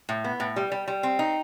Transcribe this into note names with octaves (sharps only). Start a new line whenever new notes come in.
A2
B3
A2
G3
G3
G3
C4
D#4